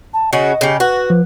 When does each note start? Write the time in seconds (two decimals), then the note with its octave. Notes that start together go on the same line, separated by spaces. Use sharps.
0.14 A5
0.33 C#3 C#4 F#4 D#5
0.61 C#3 G4
0.80 F#4 B4
1.10 F3